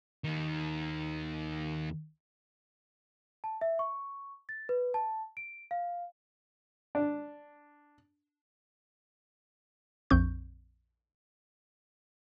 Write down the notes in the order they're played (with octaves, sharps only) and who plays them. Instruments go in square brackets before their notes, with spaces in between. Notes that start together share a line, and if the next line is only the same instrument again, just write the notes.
[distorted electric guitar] D#2 D#3
[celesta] A5
E5
C#6
A6
B4
A5
D7
F5
[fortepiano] D4
[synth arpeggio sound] A#1 F2 C4 C#6 G6